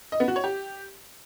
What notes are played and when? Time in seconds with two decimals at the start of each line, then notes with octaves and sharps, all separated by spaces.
0.12 D#5
0.20 B3
0.28 F#4
0.36 C#5
0.44 G4